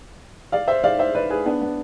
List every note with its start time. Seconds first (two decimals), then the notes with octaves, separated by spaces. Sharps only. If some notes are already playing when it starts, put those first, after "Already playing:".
0.52 D5 F5
0.67 C5 E5
0.84 D5 F5
0.99 C5 E5
1.15 B4 D5
1.30 G#4 B4
1.46 B3 D4
1.62 B3